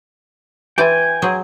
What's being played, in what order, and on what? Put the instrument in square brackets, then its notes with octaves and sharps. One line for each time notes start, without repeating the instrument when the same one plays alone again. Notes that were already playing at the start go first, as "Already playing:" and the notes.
[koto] E3 C5 D5 [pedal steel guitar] G5 G#5
[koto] F#3 G#4 C5